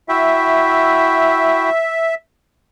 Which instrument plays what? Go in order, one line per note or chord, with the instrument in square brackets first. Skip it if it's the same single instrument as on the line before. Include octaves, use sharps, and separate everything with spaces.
[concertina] E4 F#4 G5 [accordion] E5